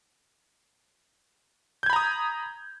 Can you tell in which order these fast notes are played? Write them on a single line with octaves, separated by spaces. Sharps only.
G6 G#6 B5 A#5 D#6